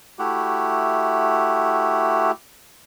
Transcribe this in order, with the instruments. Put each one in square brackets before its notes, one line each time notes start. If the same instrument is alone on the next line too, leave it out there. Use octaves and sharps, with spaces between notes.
[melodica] A3 E4 F#4 G4